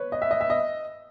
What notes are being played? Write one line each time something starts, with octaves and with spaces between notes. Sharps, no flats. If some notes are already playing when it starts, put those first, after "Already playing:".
Already playing: B4 C#5
D#5
E5
D#5
E5
D#5